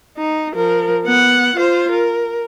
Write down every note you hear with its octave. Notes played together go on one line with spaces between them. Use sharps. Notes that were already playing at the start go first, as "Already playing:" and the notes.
D#4
F3 A#4
B3 F#5
F4 C5
A#4